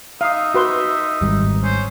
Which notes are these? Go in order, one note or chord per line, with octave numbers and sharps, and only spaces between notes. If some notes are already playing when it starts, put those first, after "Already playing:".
D#4 E5 F5 D#6
F#4 B4 C6
G#1 G3
C#4 C5